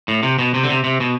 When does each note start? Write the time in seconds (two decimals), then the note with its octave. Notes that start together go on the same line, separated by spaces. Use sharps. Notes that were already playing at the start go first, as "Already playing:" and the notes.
0.08 A2
0.23 C3
0.39 B2
0.54 C3
0.63 D3
0.70 C3
0.84 C3
1.00 B2